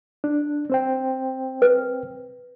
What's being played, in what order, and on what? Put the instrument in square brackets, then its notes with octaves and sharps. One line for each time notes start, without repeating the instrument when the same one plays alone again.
[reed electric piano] D4
C4 C5 G5
[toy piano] B4